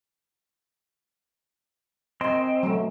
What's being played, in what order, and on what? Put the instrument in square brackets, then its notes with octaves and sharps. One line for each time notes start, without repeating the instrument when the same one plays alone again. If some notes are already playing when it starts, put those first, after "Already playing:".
[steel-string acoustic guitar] D#3 G#5 [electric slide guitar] C4 [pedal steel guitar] D#5 C6
[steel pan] F#3 A3